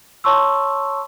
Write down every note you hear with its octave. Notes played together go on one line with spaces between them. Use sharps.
C#5 A5 C6 C#6 E6